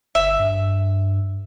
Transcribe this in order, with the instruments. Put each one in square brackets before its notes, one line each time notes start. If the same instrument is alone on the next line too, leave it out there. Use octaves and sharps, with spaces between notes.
[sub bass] G1 [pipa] E5
[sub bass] G2